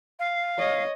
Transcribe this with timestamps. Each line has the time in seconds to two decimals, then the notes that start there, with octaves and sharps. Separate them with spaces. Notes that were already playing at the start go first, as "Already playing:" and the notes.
0.19 F5
0.59 C#5 D#5